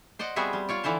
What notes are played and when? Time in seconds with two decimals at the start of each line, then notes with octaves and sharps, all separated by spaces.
0.19 C5 D5 D#5 F#5
0.36 G3 B3 C4 F#4 G#4 E5
0.53 G3
0.69 F4 C#5 D5
0.84 D3 E3 E4 C5 A5